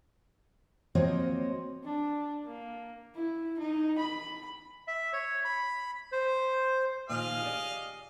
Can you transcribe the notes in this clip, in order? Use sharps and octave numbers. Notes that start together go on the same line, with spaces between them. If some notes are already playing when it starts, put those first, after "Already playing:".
F3 A#3 C4 F#4 C#5 D#5
D4
A#3
E4
D#4
B5
E5
C#5
B5
C5
A#2 D#3 F3 G#4 D#5 F5
G4 D5